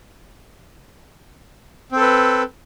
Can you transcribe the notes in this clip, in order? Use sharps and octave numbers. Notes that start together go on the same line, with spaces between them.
C4 A4 B4